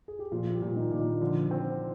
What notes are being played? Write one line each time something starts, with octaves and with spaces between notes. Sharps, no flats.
G#4
G4
A#2 F3 F4
G3 G4
A#2
D#3 D#4
A#2 D4
D#3 D#4
D3 F3
C4